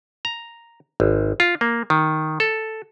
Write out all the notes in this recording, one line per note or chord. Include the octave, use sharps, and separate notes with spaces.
A#5
G#1
F4
A#3
D#3
A4